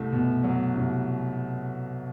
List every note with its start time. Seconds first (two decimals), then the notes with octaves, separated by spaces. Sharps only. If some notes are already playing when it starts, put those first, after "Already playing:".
Already playing: C2 A3
0.12 B2
0.44 F#3
0.76 C2